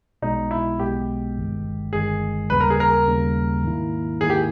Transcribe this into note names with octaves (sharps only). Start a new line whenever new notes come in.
B1 B2 G#3 B3 D#4
E4
B1 B2 G#3 B3 G4
G1 G2 D#3 G#3
G1 G2 D#3 G#3 G#4
D#2 C#3 G3 A#3 B4
A#4
G#4
A#4
D#2 C#3 G3 A#3
G#2 D#3 A#3 E4
G#2 D#3 A#3 E4 G#4
G4